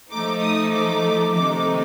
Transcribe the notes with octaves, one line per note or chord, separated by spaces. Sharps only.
F3 A3 D#4 D6
D#6
D6
C3 D#3 A3 D#4 D6